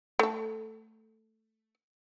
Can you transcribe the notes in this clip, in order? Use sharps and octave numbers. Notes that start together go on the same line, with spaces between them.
A3 A4